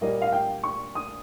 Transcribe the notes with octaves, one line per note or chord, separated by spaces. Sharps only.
A#2 G3 A#3 D#5
F5
G5
C#6
D#6